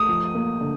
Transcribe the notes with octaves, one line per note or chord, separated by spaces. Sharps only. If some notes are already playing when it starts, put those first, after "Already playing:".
Already playing: A3 D#6
F3
A#3
D3